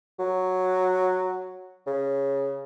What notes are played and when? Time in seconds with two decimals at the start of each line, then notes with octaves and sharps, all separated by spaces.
0.19 F#3
1.87 C#3